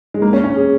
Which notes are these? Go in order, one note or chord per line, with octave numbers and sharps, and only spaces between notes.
G#3
A#3
C#4
C#4
G#4